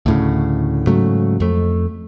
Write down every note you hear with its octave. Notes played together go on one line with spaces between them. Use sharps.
D2 A2 C#3
G#2 C#3 F#3 A3
F2 A3